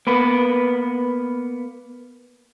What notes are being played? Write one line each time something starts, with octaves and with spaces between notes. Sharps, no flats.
A#3 B3 B4